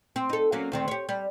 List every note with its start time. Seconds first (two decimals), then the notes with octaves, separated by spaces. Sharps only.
0.16 C4
0.29 D#4 A4
0.52 F#3 A#3 C#4
0.72 D2 D#3 C4
0.88 G4 C#5
1.09 G3